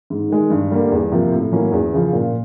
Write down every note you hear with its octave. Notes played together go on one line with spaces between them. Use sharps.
G#2
D#3 G#3
G2
D3 G3 A#3
E2
C3 F3 A#3
A2
F#3 A#3 C#4 E4
E2
C#3 F3
A#2